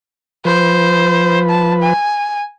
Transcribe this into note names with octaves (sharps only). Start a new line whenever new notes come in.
F3 B4 C5
A5
G#5